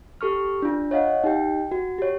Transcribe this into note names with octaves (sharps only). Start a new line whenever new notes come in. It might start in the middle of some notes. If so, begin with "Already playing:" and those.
G4 A4 C#6 F6
D4 F4
C#5 D#5 F5 F#5
D#4 G4 G5
F#4
G4 C#5